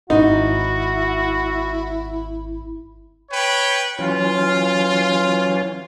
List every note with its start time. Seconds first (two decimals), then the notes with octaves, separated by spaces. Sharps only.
0.10 G#1 D#4 E4 F#4
3.31 B4 C#5 G5
3.99 E3 F#3 C#4 F4